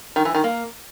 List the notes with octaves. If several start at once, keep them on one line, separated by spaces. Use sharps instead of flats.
D#3
E3
D#3
A#3